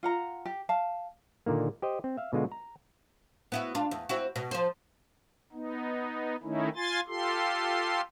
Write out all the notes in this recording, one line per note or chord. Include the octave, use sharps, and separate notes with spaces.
F4 F#5 A#5
G4
F5 A5
A#2 D3 D#3 A#3
G4 C5 D#5
C4
E5 F5
B2 D3 G#3 F4 F#4
A#5
B3 E4 F#4
D4 F4
E2
C4 E4 F#4
B2
F3 C5
B3 D#4
D#3 A3 C#4 D#4 E4
F4 G#5 C6 A6
F4 G4 A4 C6